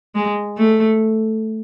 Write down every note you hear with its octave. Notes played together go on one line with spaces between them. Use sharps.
G#3
A3